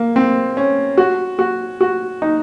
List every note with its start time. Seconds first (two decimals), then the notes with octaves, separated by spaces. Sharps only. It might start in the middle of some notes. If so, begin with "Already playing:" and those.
Already playing: A#3
0.16 C4
0.57 C#4
0.98 F#4
1.39 F#4
1.81 F#4
2.22 D#4